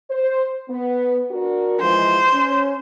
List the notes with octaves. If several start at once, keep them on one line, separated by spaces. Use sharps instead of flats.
C5
B3
D4 F#4 A#4
E3 F3 G#3 C5
C#4